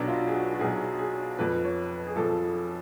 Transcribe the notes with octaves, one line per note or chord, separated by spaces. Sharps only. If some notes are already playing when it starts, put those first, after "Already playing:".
Already playing: B1 B2 F#3 D4
F4
G#4
F#4
F#4
B1 B2 F#3 G#4
G#4
F2 F3 B4
C#5
B4
G#4
F2 F3 A4